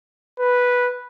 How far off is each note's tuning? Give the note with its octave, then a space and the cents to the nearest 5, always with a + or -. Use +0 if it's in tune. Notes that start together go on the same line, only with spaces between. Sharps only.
B4 -5